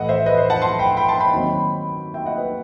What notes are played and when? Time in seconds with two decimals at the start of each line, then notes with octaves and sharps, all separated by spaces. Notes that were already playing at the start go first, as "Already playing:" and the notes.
Already playing: A2 E3 A3 E4 D#5 F#5
0.08 C5 E5
0.26 B4 D#5
0.38 C5
0.50 F#5 A5
0.62 A5 C6
0.79 G5 B5
0.97 G5 B5
1.08 A5 C6
1.20 G5 B5
1.32 D#2 D#3 F#3 C4 D#4
2.14 E5 G5
2.26 D#5 F#5
2.38 B4 D#5